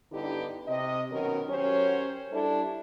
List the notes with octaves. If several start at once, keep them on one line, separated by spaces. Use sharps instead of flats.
G2 D3 B3 D#4 E4 G4
C3 D#5
B2 D#3 F#3 C#4 A#4
F#3 C#4 G4 A#4 C5 C#5
G3 D4 E4 A4